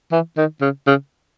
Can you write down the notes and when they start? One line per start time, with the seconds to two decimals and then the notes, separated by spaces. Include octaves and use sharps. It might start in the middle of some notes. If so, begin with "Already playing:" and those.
0.12 E3
0.37 D#3
0.61 C#3
0.87 C#3